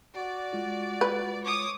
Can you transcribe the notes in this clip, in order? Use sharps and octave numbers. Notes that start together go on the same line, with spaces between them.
F#4 D5
G#3 F4
B4
C#5 D6 D#6